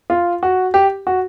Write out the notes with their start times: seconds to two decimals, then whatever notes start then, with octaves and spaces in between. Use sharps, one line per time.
0.10 F4
0.43 F#4
0.74 G4
1.07 F#4